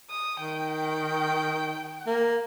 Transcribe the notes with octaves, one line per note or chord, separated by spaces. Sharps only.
D#6
D#3 G5
A#3